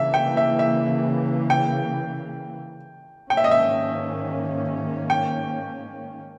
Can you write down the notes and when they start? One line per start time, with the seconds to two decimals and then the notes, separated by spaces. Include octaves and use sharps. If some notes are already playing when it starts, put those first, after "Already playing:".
Already playing: C#3 E3 A#3 E5
0.14 G5
0.37 E5
0.59 E5
1.50 G5
3.30 G#2 D#3 A#3 C#4 G5
3.37 E5
3.44 D#5
3.51 E5
5.10 G5